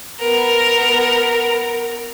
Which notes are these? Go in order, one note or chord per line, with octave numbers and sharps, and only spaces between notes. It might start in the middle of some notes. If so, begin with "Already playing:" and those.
B3 A#4